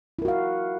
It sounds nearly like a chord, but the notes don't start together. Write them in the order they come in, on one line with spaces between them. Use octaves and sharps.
E4 A#4 F#4 F5